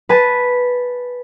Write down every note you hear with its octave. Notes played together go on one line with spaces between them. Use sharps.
B4 G#5 A5